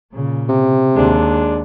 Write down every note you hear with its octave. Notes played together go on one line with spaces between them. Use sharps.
A#2 C#3
C3
D#2 G#3 D4